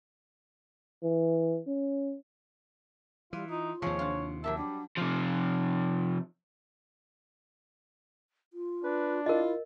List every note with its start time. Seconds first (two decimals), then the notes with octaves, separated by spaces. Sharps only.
1.03 E3
1.67 C#4
3.33 E3 G3 F4
3.49 D#4 F4
3.82 D#2 C3 F3 G#3 C#5
3.99 D4 F4 F#4
4.44 F#3 G4 A#4 E5 A5
4.58 G3 D4
4.97 C3 F3
8.53 F4
8.84 D4 B4
9.26 E4 F4 A#4 D#5